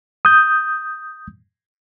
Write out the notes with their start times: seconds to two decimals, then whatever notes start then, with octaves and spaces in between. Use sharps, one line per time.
0.25 D#6 G6